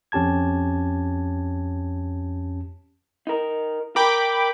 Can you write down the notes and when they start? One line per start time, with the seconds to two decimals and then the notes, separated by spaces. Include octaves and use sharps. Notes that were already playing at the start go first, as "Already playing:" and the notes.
0.12 F2 C#4 G4 A5 G#6
3.27 D#4 A#4
3.96 A#4 G5 B5 D6